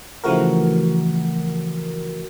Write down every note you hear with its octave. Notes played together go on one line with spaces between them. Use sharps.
C#3 E3 F3 A3 F#4 A#4